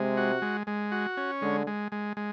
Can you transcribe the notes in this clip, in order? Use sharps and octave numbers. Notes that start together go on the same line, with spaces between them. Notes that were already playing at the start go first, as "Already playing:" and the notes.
Already playing: C3 G#3
F#4
G#3
G#3
F#4
C#4
D3 G#3
G#3
G#3
G#3